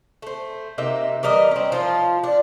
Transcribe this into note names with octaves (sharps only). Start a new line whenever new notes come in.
A3 C5
C3 A#3 D#4 E5
E3 G3 A#4 D#5
C4 C#4
F3 F4
D4